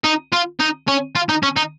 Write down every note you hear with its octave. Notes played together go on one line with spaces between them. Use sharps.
D#4
F4
D#4
C#4
F4
D#4
C#4
D#4